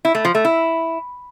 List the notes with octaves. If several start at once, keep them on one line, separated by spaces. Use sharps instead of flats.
E4
A3
F3
A3
E4